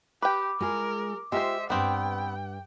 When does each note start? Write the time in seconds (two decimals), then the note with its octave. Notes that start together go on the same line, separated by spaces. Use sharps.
0.22 G4 B4 G5 D6
0.60 G#3 F4 G#4 A#4
1.32 G#3 F4 G4 C5 E5
1.70 G2 B3 C4 D4 D5 G5